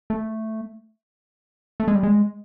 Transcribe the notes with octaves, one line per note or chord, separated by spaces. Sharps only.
A3
A3
G#3
G3
G#3